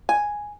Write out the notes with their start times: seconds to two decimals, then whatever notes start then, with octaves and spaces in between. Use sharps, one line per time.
0.09 G#5